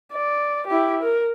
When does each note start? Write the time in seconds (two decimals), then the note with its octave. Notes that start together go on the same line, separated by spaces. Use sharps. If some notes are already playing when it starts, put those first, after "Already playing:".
0.13 D5
0.68 E4 G4
1.03 A#4